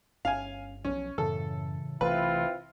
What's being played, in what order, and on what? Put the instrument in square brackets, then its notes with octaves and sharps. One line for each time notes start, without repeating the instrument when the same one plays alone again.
[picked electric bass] G1 [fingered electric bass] C#4 [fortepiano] F5 G#5
[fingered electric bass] B1 F3 [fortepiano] C#4
[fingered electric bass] F#2 [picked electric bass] A2 C#3 E3 [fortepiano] A4
[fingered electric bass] B1 C3 A3 [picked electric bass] E3 [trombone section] C4 E4 F4 [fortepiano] B4